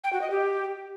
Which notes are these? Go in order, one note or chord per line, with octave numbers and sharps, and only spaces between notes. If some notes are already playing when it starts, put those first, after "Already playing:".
G5
F#4
D#5
G4